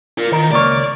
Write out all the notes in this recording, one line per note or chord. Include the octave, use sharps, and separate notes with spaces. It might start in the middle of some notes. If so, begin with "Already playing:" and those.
F4 A#4
D#3 A#4
C#2 A#3 C#5 D5